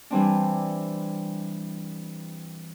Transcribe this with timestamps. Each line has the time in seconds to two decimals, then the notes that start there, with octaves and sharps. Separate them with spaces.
0.11 E3 G3 C4 D4